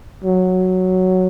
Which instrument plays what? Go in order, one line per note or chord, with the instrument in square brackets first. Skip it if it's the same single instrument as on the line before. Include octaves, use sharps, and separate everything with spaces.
[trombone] F#3